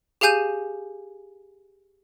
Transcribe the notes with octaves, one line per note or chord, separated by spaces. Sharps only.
G4 G#4 F5 G#5 G6 D#7